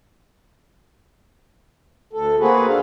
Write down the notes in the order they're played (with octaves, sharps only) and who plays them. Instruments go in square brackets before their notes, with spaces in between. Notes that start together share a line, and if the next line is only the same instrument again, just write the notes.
[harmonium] D2 A4
A#3 C4 F#4 G#4 B4
D#2 D4 A4 F5